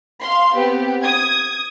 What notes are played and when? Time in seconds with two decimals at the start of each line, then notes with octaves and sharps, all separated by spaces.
0.22 F5 C6
0.54 B3 C4 G4
1.02 D#6 G#6